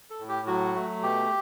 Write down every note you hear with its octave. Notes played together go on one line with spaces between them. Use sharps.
A4
A2
G4
F#3 F#4
A3
B2 G4